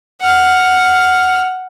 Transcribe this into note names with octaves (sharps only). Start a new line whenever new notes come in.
F#5 F6